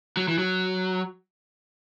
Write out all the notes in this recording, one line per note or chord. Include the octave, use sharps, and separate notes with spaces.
F#3
E3
F#3